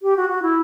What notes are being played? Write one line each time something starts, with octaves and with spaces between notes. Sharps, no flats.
G4
F#4
F#4
E4